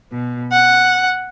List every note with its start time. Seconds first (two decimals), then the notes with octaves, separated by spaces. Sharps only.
0.11 B2
0.52 F#5